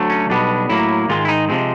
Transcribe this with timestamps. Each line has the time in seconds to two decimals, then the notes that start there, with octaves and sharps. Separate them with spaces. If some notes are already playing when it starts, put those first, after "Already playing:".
Already playing: D2 D3 F#3 A3
0.10 C#4
0.29 B1 B2 G3 B3 D4
0.69 A2 F#3 A#3 E4
1.09 G#2 D#3 G#3 F4
1.25 E4
1.28 D#4
1.49 C3 F3 G#3 C4